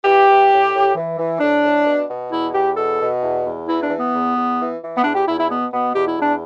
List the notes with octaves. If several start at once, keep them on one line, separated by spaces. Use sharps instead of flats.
E3 G4
E3
A2
A2
E3
E3
A2 D4
A2
B2
B2
E2 E4
E2 G4
B2 A4
B2
E2
E2
E3 E4
D4
E3
B3
E2
E2
E3
E3
B3
E2 D4
G4
E2 E4
E4
B2 B3
B2 B3
E2 G4
E4
E2 D4